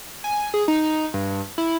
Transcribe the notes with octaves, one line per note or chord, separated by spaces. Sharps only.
G#5
G#4
D#4
G2
E4